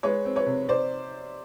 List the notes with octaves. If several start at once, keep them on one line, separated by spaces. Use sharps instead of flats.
G#3 B4 C#5
C4
B4 C#5
C3
C3 C5 D5